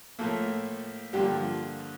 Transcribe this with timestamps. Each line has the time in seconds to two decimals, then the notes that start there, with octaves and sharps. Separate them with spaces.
0.19 A2 F3 A3 A#3 A4
1.13 G2 D3 F3 G3 A#3 G4
1.37 F3 F4